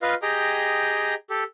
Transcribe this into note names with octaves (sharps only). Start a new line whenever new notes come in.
F4 B4 D#5 F5
G4 G#4 D#5 G5 A#5
G4 A4